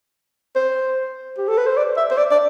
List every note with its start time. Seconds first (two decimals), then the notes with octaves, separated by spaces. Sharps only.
0.56 C5
1.38 G4
1.48 A4
1.58 B4
1.67 C5
1.77 D5
1.97 E5
2.11 C5
2.18 D5
2.31 D5